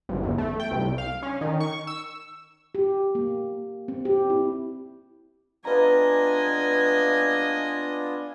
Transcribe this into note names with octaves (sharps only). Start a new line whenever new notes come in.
G1
E2
A3
G5
C2
F5
C#4
D#3
C#6
E6
G4
A#3
C4
G4
E4
B3 D4 F4 B4 D#5 G#5 A#5